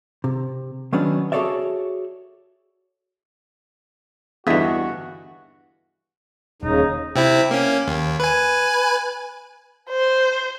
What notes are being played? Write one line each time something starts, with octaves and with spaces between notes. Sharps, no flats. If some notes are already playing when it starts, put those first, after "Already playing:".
C3
D#3 F#3 B3 C#4 D4
F#4 G#4 A4 C#5 D5 E5
E2 G2 D3 E3 F#4 D#5 E5
D#1 D#2 C#3 D#4
C3 C4 E4
A#3 C#4
D#2
B4 G#5
C5